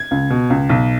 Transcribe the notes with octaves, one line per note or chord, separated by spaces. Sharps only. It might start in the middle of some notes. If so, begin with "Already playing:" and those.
Already playing: G#6
C#2
B2
C#2
B1